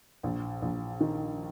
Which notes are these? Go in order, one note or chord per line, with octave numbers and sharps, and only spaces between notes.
A#1
A#1
D#3